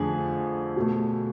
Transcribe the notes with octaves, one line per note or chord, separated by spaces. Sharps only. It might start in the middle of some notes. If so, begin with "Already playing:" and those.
Already playing: F2 D3 A3 G#4
B2 A3